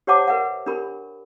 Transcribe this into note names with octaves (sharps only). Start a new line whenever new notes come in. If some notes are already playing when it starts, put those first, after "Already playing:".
G4 C5 C#5 F#5 A5 D6
A#4 B4 E5 F#5
D4 G4 A#4 B5